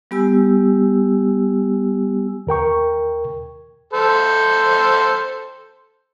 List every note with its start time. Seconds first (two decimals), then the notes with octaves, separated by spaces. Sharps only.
0.11 G3 B3 G4 G#5 E6
2.47 D#2 A#4 G5 C#6
3.93 A4 C5